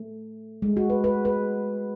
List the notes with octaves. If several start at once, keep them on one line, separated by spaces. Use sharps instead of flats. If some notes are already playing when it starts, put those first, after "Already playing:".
Already playing: A3
G#3
F#4
B4
B4
B4